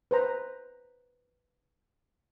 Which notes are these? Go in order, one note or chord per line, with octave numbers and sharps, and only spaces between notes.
B4 C5 A#5